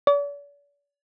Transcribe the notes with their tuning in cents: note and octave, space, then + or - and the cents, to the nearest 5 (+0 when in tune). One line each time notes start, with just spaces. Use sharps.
D5 -45